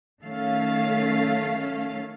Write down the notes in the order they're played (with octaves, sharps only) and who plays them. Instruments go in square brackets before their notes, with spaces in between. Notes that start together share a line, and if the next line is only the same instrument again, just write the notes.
[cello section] D#3 F#3 A3 C#4 A4 F5